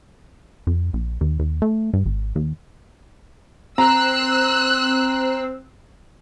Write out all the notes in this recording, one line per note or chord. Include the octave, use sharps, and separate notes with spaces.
F2
A#1
D#2
D#2
A3
G2
G#1
D#2
C4 A#5 E6 F#6